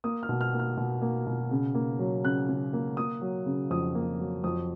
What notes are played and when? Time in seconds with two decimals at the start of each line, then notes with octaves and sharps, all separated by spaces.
0.04 A#3 D#6
0.23 F6
0.29 B2
0.41 F6
0.53 A#3
0.59 F6
0.77 B2
1.02 A#3
1.27 B2
1.51 C#3
1.75 A#3
1.99 F#3
2.24 C#3 F#6
2.49 C#3
2.73 A#3
2.97 A#3 D#6
3.22 F#3
3.46 C#3
3.70 F2 D#6
3.95 A#3
4.20 F#3
4.44 F2 D#6